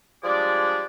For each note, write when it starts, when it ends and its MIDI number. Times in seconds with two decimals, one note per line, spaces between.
0.23 0.85 53
0.23 0.85 55
0.23 0.85 56
0.23 0.85 62
0.23 0.85 68
0.23 0.85 74